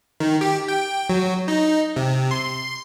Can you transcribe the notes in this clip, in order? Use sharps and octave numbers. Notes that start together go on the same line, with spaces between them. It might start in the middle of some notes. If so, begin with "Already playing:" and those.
D#3
G4
G5
F#3
D#4
C3
C6